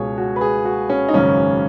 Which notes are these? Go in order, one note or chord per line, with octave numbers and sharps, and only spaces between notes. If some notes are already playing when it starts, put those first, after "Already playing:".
Already playing: C#2 B2 G#4 C#5
F#4
B4
G#4
F#4
C#4
D#4
G#1 F#2 C#3 C#4